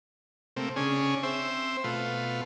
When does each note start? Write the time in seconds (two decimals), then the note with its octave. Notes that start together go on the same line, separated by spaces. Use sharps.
0.56 C3 A3 A#3 C4
0.76 C#3 C#4 D4 G#4
1.23 C4 C5 E5
1.84 B2 A3 F4 B4